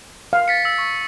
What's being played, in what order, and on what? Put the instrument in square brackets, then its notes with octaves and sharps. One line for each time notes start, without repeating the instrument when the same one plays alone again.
[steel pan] F5
[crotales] A6 B6 C#7
E6
C#6